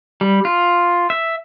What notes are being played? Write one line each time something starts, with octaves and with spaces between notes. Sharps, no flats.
G3
F4
E5